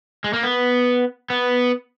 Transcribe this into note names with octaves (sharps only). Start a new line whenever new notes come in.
G#3
A#3
B3
B3